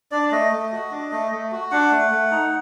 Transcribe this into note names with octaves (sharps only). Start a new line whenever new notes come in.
D4 D5
A3 D#5
A3
F#4
D4
A3
A3
F#4
D4 F#5
A3
A3
D#4